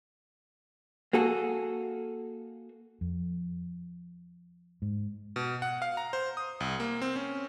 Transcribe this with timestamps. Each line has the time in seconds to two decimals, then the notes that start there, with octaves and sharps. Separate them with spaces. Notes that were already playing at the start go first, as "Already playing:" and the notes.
1.13 A#3 F#4 G#4 A4
3.01 F2
4.82 G#2
5.36 B2
5.62 F#5
5.82 F5
5.97 A#5
6.13 C5
6.37 D#6
6.60 C2
6.80 A#3
7.02 C4
7.16 C#4